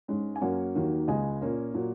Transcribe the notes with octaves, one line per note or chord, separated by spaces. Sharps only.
G#2 G#3 C#4
G#5
F#2 F#3 A#3 C#4 C#5 F#5
D#2 D#3 F#3 A#3
C#2 C#3 G#3 D#5 G#5
A#2 A#3 C#4
A#2 F#3 A#3